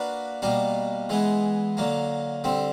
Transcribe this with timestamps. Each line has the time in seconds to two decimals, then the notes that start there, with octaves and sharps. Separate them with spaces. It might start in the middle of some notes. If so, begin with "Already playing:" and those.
Already playing: A#3 D4 F#4 B4 D5
0.42 B2 G3 A#3 D4
1.09 E3 G#3 B3
1.77 D3 F#3 A#3
2.44 D3 G3 C4